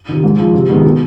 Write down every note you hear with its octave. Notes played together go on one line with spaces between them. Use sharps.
C3 D#3
G#2
F3 G#3
C3
D#3 G#3 B3
B2